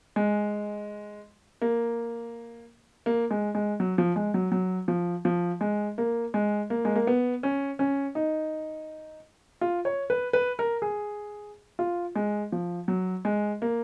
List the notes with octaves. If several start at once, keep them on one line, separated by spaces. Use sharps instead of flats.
G#3
A#3
A#3
G#3
G#3
F#3
F3
G#3
F#3
F#3
F3
F3
G#3
A#3
G#3
A#3
G#3
A#3
B3
C#4
C#4
D#4
F4
C#5
B4
B4
A#4
G#4
F4
G#3
F3
F#3
G#3
A#3